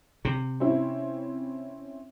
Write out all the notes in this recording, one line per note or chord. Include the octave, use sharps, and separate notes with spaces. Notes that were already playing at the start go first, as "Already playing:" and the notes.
C3
C4 C#4 E4